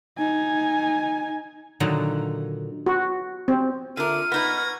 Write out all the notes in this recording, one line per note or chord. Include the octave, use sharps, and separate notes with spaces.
D#4 G#5
A#2 D3 D#3 F#3
F#4
C4
D3 F4 A#4 E5 D6 F6 D#7
B3 D#4 B4 C#6 G#6 A#6